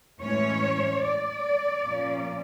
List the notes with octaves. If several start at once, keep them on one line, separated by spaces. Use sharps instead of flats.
A2 E3 G#3 C#4 C#5
D5
A#2 F3 A#3 C#4